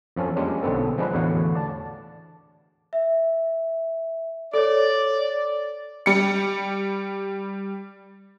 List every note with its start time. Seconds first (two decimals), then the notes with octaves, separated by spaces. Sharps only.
0.16 F2 F3 C#4 A4 F5
0.36 G3 G#3 A#3 C#4 D4 F4
0.63 B1 D3 B3 C4 A4
0.98 F3 G#3 D4 B4
1.13 E2 A2 D3 F#4 C#5 F5
1.55 D5 A5
2.93 E5
4.54 A4 C#5 D5
6.06 G3 C#7